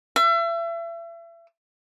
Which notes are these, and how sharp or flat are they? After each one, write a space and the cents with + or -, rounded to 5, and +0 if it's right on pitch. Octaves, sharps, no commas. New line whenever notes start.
E5 +35